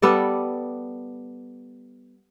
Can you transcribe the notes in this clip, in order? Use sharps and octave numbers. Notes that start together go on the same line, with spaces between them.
G3 B3 A4 D5